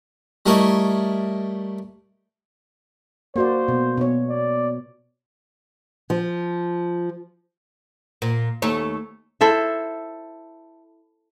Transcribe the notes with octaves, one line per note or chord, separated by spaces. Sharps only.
G3 A3 E4 A#4 C#5 D#5
A#3 F#4 C5 D5
B2
B2 C#5
D5
F3
A#2
D#2 A3 C#5
E4 A4 C5 E5